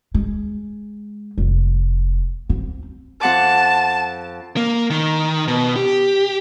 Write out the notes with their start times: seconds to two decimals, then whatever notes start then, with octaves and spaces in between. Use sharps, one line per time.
0.14 G#3
1.38 F1
2.50 C4
3.21 F2 F#5 A5 D6
4.57 A#3
4.90 D#3
5.48 B2
5.76 G4